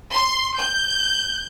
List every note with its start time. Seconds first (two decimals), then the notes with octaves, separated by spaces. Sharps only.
0.12 C6
0.59 G6